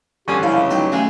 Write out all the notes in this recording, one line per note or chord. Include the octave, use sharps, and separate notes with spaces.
G2 D3 F3 C#4 G4
C#2 E4 F5
F#3 D#4 G4 D5
C#3 G#3 A3 C#4